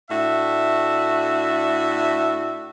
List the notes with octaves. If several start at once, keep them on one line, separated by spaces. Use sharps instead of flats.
A2 D4 F#4 E5